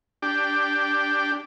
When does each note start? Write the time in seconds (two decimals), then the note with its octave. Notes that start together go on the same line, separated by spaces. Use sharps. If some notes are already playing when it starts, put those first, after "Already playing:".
0.22 D4 G4